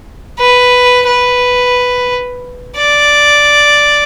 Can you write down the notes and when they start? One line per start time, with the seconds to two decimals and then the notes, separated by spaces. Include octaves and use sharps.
0.39 B4
1.07 B4
2.77 D5